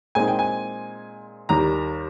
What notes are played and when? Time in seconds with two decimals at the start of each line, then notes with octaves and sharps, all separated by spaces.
0.15 A#2 G#3 C4 D#4 G#5
0.28 G5
0.39 G#5
1.49 D#2 D#3 G3 A#5